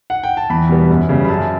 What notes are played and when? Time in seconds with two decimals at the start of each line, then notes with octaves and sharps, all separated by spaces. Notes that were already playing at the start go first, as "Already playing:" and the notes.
0.10 F#5
0.23 G5
0.37 A5
0.49 E2 B5
0.69 B2 G3 B3
0.90 F#2
1.09 C#3 G3 B3
1.25 B5
1.28 F#2 A5